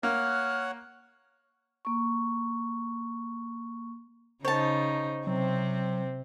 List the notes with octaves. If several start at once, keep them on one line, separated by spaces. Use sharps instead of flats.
A#3 C#5 F#5 F6 F#6
A#3 C#6
C#3 D#4 C5 C#5 A5
C3 F#3 C4